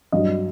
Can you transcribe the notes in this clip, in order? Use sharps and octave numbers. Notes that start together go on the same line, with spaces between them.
G2 F#3 D#5